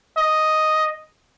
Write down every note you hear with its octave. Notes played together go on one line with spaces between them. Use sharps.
D#5